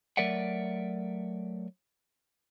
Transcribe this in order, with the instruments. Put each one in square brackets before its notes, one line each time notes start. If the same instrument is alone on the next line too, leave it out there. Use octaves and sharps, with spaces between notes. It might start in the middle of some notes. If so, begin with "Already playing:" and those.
[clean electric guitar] F#3 A3 A#4 D5 E5 F#5